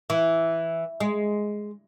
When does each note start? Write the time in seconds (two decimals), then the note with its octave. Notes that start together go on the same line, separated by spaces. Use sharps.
0.10 E3
1.00 G#3